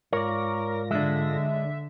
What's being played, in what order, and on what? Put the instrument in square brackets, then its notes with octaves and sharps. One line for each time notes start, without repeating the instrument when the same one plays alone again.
[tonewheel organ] G#2 F4 A#6 [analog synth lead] A#4 [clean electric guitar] C#5 D5
[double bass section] D3 [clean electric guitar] G#3 D4 [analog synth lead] E5